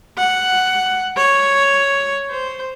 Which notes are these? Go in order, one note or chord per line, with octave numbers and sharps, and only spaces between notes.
F#5
C#5
C5